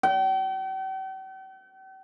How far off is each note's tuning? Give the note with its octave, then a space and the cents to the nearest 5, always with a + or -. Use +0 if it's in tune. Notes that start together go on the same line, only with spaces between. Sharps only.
G5 -45